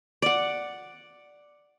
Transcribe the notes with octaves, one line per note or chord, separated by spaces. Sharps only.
D5 F#5